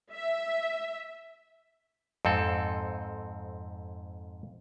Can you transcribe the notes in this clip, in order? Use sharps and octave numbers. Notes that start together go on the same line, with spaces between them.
E5
F2 G#2 C4 A4